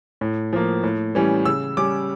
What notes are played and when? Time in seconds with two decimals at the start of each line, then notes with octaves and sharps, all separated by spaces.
0.21 A2
0.53 F3 A#3
0.83 A2
1.15 E3 G3 C#4
1.45 C#3 E6
1.77 G3 C#4 D6